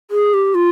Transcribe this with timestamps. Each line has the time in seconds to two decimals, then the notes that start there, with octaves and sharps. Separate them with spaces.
0.11 G#4
0.34 G4
0.55 F4